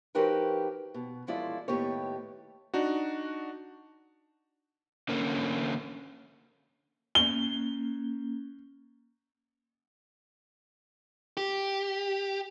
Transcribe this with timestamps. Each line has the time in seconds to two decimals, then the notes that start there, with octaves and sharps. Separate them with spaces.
0.15 F3 D#4 F#4 G4 A#4 B4
0.94 B2
1.27 F#2 F3 G#3 E4 F4 D5
1.68 D#2 A2 B3 G4 C#5
2.74 D4 D#4 F#4
5.09 D3 A#3 C#4
7.15 A#3 C#4 G7
11.37 G4